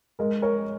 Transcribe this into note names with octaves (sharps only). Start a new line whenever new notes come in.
G#3 A#4
A#4 C#5